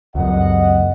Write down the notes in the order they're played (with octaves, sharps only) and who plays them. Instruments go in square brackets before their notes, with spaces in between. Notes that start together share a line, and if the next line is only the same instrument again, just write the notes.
[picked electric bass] C#2 F#2 [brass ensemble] D#5 F#5